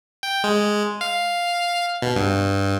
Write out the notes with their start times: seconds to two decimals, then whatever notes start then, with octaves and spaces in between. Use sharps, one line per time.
0.23 G5
0.44 G#3
1.01 F5
2.02 B2
2.16 G2